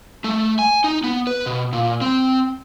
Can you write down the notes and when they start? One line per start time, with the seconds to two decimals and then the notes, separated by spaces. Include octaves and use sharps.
0.24 A3
0.59 G#5
0.84 D#4
1.04 B3
1.27 B4
1.46 B2
1.73 A#2
2.01 C4